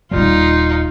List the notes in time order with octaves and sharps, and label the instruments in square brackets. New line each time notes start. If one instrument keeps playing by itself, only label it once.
[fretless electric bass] D#1 D#2 G3 [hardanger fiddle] D#4 F4